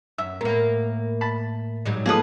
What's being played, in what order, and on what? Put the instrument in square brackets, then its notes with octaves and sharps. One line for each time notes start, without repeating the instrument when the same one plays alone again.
[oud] F#2 [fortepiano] E5
[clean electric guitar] A2 A#4 [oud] A#3 B3
[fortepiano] A5 B5
[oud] G#2 F#3 G3
[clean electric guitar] F3 [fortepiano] A#3 D#6 [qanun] G#4 A4 B4